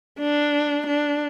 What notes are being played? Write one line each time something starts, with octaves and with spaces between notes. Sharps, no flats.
D4
D4